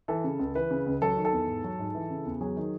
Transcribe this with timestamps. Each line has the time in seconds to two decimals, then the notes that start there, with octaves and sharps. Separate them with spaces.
0.08 E3 A4
0.24 C#3
0.39 C#2
0.55 E3 B4
0.71 C#3
0.86 C#2
1.02 F#3 A4
1.17 D#3
1.25 A4
1.33 E2
1.48 G#2
1.64 F#3
1.79 G#2
1.95 E3
2.10 C#3
2.26 E2
2.41 F#3 G#4
2.57 D#3